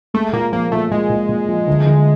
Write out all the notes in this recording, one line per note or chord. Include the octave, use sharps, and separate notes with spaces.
G#3 A3
A#2 A#3
F3 A#3
A#2 A3
A#2 G#3
A#2
A#2
F3
D2
D2